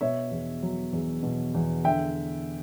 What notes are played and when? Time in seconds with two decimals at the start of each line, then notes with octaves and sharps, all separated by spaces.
0.01 B2 C#5 E5
0.31 E2
0.63 F#3
0.93 E2
1.23 B2
1.54 E2
1.84 D3 E5 G5